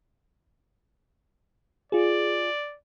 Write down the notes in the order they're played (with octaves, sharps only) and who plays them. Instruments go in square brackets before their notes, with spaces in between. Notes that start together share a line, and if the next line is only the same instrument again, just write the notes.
[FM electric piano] F4 G#4 [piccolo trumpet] D5